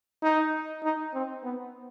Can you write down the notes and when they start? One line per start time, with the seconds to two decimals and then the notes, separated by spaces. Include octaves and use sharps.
0.23 D#4
0.83 D#4
1.14 C4
1.44 B3